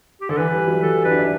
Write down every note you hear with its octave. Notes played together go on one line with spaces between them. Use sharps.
G4
D3 A4
E3 B4
G3
F#3
E3 A4
D4 B4
E4
D4